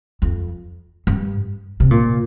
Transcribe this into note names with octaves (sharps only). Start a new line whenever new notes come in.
F2
G2
C3
A#2